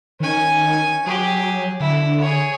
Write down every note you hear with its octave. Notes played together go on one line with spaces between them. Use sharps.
D#3 C#4 G#5
F#3 G4 G#4
D3 E4
G#4 C#5